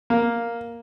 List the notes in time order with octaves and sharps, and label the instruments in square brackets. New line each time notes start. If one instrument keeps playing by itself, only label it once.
[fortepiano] A#3